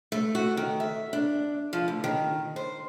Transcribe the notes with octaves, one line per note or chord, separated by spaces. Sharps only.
A3
F#4
D#3
E5
D4
F3
D2
D#3
C5